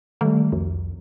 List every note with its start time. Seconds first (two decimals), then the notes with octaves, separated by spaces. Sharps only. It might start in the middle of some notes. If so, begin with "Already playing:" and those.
0.21 D#3 G3 A3
0.52 C2 F2